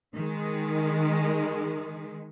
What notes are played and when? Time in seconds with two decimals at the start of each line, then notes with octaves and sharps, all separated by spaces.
0.13 D#3 G#3